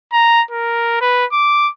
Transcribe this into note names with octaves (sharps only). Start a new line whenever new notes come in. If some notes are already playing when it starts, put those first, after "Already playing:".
A#5
A#4
B4
D6